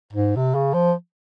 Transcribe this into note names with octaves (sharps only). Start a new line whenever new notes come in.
G#2
C3
C#3
F3